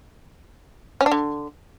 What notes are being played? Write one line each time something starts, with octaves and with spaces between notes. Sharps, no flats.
C#4
D4
D3